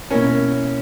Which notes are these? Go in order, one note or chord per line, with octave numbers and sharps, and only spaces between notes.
B2 A#3 C#4 E4 A#4 C#5